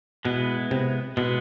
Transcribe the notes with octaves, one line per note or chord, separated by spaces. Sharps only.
B2 G#3 B3 E4
C3
B2 G#3 B3 E4